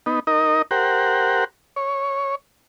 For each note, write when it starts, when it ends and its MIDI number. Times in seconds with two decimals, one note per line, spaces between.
0.06 0.20 59
0.06 0.20 63
0.27 0.62 63
0.27 0.62 70
0.27 0.62 75
0.71 1.44 67
0.71 1.44 70
0.71 1.44 72
0.71 1.44 78
1.76 2.35 73